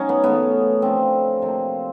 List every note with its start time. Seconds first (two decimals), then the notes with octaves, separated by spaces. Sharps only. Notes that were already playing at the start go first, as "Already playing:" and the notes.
Already playing: F#3 C#4 D#4
0.09 B3
0.23 C#3 E3 A3 B3
0.82 D3 F3 A3 C4
1.42 C3 F3 A#3